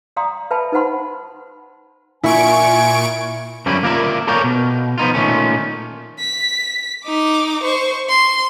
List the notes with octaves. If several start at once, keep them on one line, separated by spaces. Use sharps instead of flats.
D5 F5 G5 A#5 C6 D#6
B4 E5 F5 G5 A5 B5
D#4 B4 C5 F#5 B5 C6
A#2 E4 G#5 C#6 D7
F#2 F3 G3 C#4 E4
A#3 F4 A#4 D5 E5
A4 A#4 C#5 D5 F5 G5
B2
F3 B3 D#4 F4
A#2 D#3 A3 C#4
B6
D#4 D6
C5 C#6
C6